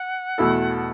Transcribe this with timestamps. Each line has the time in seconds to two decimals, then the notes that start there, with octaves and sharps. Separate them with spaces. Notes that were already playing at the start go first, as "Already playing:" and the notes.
Already playing: F#5
0.38 E2 B2 A3 E4 A4